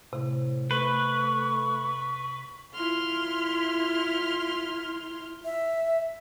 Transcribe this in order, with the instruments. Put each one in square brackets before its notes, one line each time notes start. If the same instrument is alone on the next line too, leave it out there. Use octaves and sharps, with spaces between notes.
[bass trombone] A2 [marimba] C3
[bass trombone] A3 [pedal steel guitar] B4 [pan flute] C#6
[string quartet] E4 F4 C6 F6
[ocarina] E5